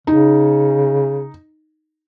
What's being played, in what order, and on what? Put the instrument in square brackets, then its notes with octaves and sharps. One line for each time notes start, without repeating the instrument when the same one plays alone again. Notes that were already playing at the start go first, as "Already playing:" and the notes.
[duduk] C#3 [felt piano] D#4